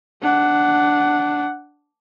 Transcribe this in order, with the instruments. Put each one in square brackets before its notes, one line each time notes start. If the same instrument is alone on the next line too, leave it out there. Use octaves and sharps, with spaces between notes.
[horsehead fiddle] D4 F#5